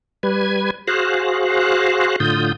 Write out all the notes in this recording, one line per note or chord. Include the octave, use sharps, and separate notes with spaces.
G3 B4 G#6
F#4 G#4 C5 F5 F#6
A2 D3 F4 D#6 G6